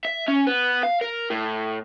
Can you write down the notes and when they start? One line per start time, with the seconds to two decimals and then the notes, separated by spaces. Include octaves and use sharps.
0.05 E5
0.28 C#4
0.47 B3
0.83 F5
1.01 A#4
1.30 A2